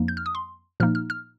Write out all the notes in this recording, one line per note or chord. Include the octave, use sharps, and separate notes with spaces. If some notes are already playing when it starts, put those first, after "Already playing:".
Already playing: F2 F3 A#3 D#4
G6
F6
D#6
C6
A#2 F3 A#3 D#4 F6
F6
F6